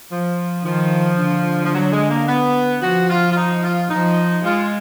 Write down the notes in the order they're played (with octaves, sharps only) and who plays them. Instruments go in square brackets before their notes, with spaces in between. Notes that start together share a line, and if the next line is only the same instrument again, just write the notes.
[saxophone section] F3
[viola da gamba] D#3 [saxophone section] F3
[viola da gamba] D3
[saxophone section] F3
F#3
G#3
A#3
B3
[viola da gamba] F3 [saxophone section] F#4
[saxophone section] F4
F4
D#4
F4
[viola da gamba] F3 [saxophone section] D#4
[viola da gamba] G#3 [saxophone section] F4